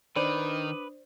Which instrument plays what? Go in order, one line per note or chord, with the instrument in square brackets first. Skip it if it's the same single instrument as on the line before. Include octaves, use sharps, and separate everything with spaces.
[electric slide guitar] D#3 [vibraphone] D4 D#6 [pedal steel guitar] B4 [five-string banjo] C5 D5